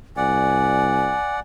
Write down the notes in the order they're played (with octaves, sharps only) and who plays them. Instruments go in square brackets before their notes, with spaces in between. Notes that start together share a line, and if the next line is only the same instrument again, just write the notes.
[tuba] C2 [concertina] D5 F#5 [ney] G#5